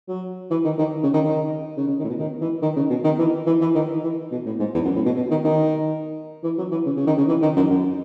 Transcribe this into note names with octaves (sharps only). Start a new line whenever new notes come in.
F#3
E3
D#3
D#3
C#3
D#3
D#3
C#3
C#3
D#3
A2
B2
D#3
E3
D#3
C#3
B2
D#3
E3
E3
E3
D#3
E3
B2
A2
G#2
E2
F#2
A2
B2
B2
D#3
D#3
E3
F#3
E3
C#3
C#3
D#3
C#3
E3
D#3
F#2
F#2